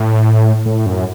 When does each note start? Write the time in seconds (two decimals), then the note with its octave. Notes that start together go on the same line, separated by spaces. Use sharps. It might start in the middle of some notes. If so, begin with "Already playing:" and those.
Already playing: A2
0.66 A2
0.86 F#2